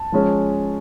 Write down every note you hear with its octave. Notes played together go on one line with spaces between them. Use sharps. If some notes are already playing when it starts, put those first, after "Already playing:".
Already playing: A5
F3 G#3 C#4